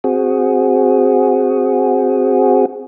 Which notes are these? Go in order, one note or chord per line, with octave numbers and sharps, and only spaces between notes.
C4 F#4 G#4